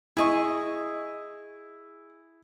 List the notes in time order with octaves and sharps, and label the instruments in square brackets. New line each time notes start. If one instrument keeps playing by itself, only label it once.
[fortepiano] E4 [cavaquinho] G#4 D#5 C#6